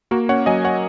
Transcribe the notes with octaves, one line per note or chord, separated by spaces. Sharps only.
A#3 F#4 A#4
C#4 C#5 F#5
F#3 D#5 G#5
C#5 F#5